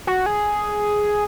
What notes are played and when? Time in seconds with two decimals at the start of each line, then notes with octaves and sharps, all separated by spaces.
0.07 F#4
0.26 G#4